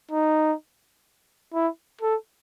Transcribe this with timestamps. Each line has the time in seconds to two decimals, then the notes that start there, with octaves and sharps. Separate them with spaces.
0.11 D#4
1.53 E4
2.01 A4